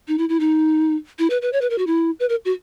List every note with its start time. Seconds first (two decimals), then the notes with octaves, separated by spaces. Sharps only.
0.08 D#4
0.18 E4
0.29 E4
0.40 D#4
1.19 E4
1.30 B4
1.42 B4
1.53 C#5
1.61 B4
1.70 A#4
1.78 F#4
1.87 E4
2.20 B4
2.29 A#4
2.45 F#4